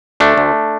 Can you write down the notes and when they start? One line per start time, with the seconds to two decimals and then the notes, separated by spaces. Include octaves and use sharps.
0.20 D2 A3 D4
0.38 D2